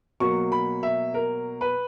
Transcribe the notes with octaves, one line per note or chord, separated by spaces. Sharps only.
B2 F#3 A#3 C#6
B5
E5
A#4
B4